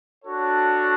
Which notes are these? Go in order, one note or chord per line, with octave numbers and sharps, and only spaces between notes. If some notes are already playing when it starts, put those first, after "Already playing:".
D4 F#4 A4 C#5